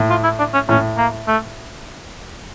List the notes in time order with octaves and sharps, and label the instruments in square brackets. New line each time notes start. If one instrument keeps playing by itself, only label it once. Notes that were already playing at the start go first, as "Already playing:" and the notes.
Already playing: [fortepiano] A2
[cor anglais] F4
E4
D4
C#4
[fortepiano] A2 [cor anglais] C#4
[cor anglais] A#3
A3